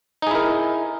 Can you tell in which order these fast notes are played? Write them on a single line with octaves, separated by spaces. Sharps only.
D#4 G#4 E4 A#4